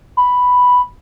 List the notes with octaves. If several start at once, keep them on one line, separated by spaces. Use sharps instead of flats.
B5